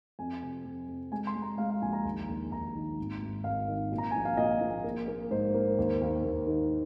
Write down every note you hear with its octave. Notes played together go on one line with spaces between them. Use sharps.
F2 G#5
C3
F2
F2
G#3 G#5
C6
G#3
A#5
G#3 F5
F5
A#1 G#5
A#5
D#2
D#2
D#2 A#5
D#3
G#1
G#1
G#1 F5
D#3
A#2
A#5
A#1 G#5
F5
A#2 D#5
A#1
A#3
A#3
G#2 C5
A#3
D#2
D#2
D#2
D#3